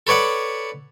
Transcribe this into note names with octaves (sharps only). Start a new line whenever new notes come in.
A4 B4 C#5 D5 F#5